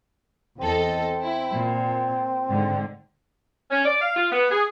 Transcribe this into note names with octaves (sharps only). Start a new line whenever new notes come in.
E2 C4 A4 D#5
E4
A#2
G#2 D3
C#4
D5
F5
F4
B3
G#4